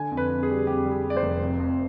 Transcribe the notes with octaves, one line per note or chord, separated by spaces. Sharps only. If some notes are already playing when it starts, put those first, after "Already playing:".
Already playing: D3 G#5
F2
B4
F2
G#4
G3
F2 G4
G3
G#4
G3
D5
C5
F1
F2
F2